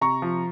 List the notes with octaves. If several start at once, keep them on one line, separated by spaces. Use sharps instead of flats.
C3 A#5 C#6
F3